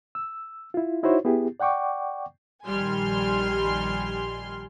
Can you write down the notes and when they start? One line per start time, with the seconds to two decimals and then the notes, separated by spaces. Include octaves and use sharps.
0.15 E6
0.74 E4 F4
1.03 D#4 E4 F#4 C5 C#5
1.25 B3 E4 G4 G#4
1.60 D5 F#5 G5 C#6 D6
2.66 A#1 D#3 G3 G#5 C6 F6